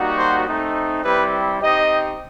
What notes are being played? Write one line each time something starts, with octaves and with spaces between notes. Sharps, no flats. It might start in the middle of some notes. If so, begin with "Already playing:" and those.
Already playing: G3 A#3 D#4 F#4
C5
A3 C4 D#4
G3 C4 E4 G4 B4
C4 D#4 G4 D#5